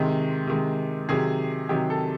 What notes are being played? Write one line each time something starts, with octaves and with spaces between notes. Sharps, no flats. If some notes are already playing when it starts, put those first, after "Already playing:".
Already playing: C3 D#3 G#3
C3 D#3 G#3
C3 D#3 F#3 G#4
C3 D#3 F#3 G4
A4